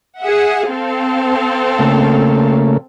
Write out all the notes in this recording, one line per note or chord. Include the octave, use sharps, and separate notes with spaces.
G#4 E5 F#5
C4 A4 F5
C#3 A3 A#3